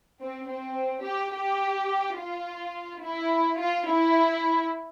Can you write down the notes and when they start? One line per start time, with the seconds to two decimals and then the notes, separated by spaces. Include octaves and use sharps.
0.21 C4
0.49 C4
1.04 G4
1.33 G4
2.17 F4
3.02 E4
3.59 F4
3.88 E4